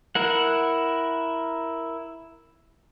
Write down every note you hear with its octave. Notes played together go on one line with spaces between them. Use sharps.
E4 A#4 F#5